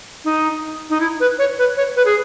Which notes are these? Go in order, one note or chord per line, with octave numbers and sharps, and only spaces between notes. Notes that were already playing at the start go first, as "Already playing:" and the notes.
D#4
D#4
E4
B4
C#5
B4
C#5
B4
G#4